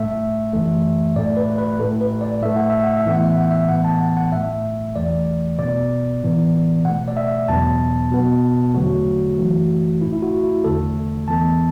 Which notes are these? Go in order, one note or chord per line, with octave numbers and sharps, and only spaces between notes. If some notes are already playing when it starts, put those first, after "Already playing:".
Already playing: A2 A3 E5
F#2 E3 A3
A2 A3 D5
B4
B4
A2 A3 A4
B4
D5
A2 A3 E5
F#5
E5
F#5
E5
A2 E3 B3 F#5
E5
F#5
E5
A2 E3 B3 F#5
A5
F#5
F#5
A2 A3 E5
E2 E3 A3 D5
B2 B3 D5
A2 E3 B3
B2 A3 F#5
D5
E5
E2 B2 F#3 B3 A5
B2 B3
E2 D3 F#3 A3 F#4
F#2 E3 A3
A2 A3 E4
E4
F#4
E4
E2 D3 A3 A4
E2 E3 B3 A5